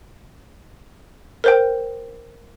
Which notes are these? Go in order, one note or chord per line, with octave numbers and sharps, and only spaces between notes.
A#4 C5 G5